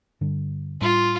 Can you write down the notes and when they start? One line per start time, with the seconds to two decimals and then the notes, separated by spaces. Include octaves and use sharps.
0.21 G2 D3 G3 D4
0.81 A2 G3 D4 F4